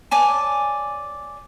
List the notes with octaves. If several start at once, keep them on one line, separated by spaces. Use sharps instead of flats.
C#5 D5 G#5 A5